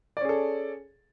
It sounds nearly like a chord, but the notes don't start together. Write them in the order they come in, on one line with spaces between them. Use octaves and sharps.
D5 C#4 G#4 A4